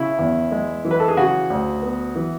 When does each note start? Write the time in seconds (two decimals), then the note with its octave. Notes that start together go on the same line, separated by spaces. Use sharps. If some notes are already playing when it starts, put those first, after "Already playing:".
Already playing: C#3 E4
0.19 E2
0.51 G#3
0.85 E3
0.91 B4
1.00 A4
1.08 G#4
1.17 C#3 F#4
1.50 D2
1.83 B3
2.15 E3